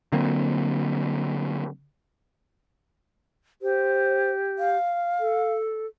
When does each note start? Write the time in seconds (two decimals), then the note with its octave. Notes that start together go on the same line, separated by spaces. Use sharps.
0.12 D3 F#3 A#3 C4
3.62 G4 C5
4.59 F5
5.20 A4